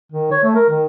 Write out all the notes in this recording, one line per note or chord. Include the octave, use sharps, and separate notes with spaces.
D#3
C#5
A3
A#4
D#3